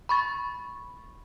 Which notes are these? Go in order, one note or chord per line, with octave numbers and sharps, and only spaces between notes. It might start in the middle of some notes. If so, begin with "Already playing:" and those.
B5 C#6 A6